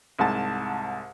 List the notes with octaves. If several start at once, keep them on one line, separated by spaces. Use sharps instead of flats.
C2 G#2 A5